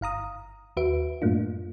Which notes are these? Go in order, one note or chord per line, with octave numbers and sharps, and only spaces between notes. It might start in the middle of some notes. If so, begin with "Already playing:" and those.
G1 F5 A#5 D#6
D#2 F#4 B4 E5 D7
F#2 A2 A3 A#3 D4 F4